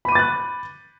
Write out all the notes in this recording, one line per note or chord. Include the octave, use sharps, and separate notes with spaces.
B5 D6 F#6 A6 D#7